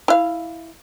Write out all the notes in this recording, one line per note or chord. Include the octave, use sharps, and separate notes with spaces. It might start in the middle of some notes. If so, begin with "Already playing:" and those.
E4 F5